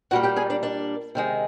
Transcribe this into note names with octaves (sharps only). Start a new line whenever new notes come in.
A#2 G3 A#3 F#4 F#5
G4 G5
G#4 G#5
D4 D5
D4 D5
C3 D#3 G#3